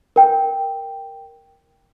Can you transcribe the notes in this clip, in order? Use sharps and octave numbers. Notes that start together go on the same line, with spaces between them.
A#4 G5